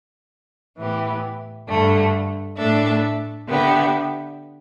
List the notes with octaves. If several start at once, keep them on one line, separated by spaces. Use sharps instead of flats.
A2 E3 B3 G4
G2 D3 A3
A2 A3 D4 A4 E5
D3 B3 G4 E5